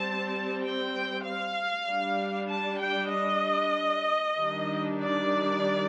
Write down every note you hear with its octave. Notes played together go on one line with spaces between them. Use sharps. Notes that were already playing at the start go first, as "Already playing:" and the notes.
Already playing: G3 C4 A5
G5
F5
G3 D4
A5
G5
D#5
D#3 G3 D4
D5